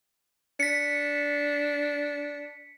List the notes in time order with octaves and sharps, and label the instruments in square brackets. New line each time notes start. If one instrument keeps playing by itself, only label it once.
[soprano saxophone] D4 [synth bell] B6 C#7